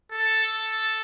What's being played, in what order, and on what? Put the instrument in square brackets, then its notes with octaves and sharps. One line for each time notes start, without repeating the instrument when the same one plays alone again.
[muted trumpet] A4